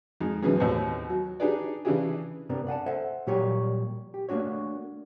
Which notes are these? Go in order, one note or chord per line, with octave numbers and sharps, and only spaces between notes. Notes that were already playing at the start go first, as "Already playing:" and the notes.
F2 G#3 D#4
F#2 B2 E3 B3 C#4 G#4
D#2 A2 B3 C4
F#3
D4 D#4 G4 G#4 B4 D5
C#3 E3 D4 E4 G4 G#4
G2 C3 G3 B3 D4 A#4
D5 F#5 G#5 A5
A4 C5 E5 F#5
A#2 F#3 G3 G4 A#4 C#5
G4
A3 A#3 D4 F#4 C#5